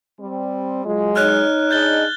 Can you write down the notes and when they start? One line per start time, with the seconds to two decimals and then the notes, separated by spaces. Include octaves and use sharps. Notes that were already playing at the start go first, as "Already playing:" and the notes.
0.19 G3 C4
0.85 F#3 G#3 F4
1.16 D#4 C#5 F6 F#6
1.71 D4 G#4 D#5 G6 A6 G7